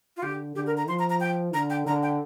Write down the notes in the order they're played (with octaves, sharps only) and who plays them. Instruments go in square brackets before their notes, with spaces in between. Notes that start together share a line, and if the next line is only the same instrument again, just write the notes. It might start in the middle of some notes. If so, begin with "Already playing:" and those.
[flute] F4
[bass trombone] D3 [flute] G4
[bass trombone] D3 [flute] G4
[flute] A#4
A#5
[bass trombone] F3 [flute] C6
[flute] A#5
A#5
G5
[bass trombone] D3 [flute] A#5
[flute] G5
[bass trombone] D3 [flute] A#5
[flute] G5